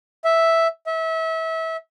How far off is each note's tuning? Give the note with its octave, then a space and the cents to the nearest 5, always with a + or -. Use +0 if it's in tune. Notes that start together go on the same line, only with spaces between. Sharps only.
E5 -5
E5 -30